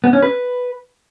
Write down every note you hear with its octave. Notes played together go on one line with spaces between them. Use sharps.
B3
C#4
B4